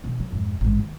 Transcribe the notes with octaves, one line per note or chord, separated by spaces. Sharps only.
B2 D#3
F#3
F2 G#2
A1 G#2
D#3 A#3